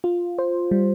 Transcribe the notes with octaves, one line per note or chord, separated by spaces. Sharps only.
F4
C5
G3